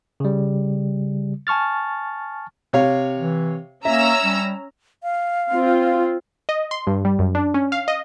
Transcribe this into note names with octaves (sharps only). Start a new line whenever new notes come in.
C#3 G3
G#5 A5 C#6 F6 A6
C3 C#5 F5
E3
A#3 C#4 E5 A#5 E6
G3
F5
C4 F4
D#5
C6
G2
G3
F#2
D4
C#4
F5
D#5